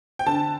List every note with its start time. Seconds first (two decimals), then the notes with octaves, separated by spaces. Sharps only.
0.19 G5
0.26 D3 A5